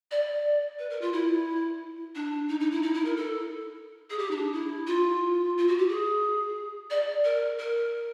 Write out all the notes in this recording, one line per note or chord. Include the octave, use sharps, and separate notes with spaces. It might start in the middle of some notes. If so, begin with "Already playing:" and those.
D5
B4
A#4
F4
E4
D4
D#4
D#4
E4
D#4
E4
A#4
A4
G#4
G4
D#4
D4
E4
F4
F4
F#4
G4
G#4
D5
A#4
A#4